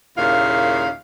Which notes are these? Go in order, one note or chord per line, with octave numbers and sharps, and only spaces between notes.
D#2 A#2 C#3 E4 F5